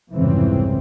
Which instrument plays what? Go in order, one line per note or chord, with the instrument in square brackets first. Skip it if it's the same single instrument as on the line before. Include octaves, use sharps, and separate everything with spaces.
[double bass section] C2 F2 G#2 C#3 E3 C4